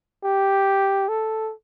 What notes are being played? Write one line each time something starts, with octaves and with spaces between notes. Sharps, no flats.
G4
A4